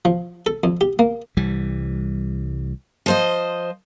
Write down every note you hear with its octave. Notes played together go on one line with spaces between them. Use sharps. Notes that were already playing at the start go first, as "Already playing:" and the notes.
F3
A4
F2
G4
A#3
C2 E3 G3
F3 C5 D#5